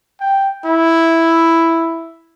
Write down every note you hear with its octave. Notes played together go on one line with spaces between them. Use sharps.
G5
E4